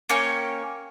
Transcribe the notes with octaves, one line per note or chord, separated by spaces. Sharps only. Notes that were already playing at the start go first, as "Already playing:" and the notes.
A#3 C#4 C#5 G5